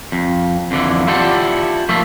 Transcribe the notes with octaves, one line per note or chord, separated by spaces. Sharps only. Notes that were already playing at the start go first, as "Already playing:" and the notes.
F2
F2 D3 E3
E4 F4 G4 A4 D5 F#5
F3 A3 A#3 F4 E5